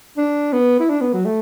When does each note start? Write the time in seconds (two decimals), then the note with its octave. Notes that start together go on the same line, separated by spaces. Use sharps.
0.17 D4
0.53 B3
0.80 E4
0.90 D4
1.02 B3
1.13 F#3
1.25 A3